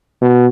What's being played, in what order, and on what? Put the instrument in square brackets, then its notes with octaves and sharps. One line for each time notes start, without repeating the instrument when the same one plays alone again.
[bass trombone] B2